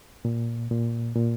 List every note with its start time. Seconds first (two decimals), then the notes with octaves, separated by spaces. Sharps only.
0.25 A#2
0.71 A#2
1.16 A#2